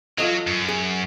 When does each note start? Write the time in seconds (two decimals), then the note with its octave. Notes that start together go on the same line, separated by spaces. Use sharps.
0.18 F#3 F4 A4 D#5
0.47 F#2
0.69 G#4